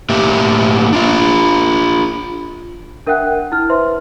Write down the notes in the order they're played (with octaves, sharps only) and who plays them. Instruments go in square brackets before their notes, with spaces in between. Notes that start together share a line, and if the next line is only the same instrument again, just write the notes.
[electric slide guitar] A2 A#3 G4 E5
D4 F4
[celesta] D4 A#4 E5 F#5 G5 F#6
E4 F6
B4 C5 E5 C6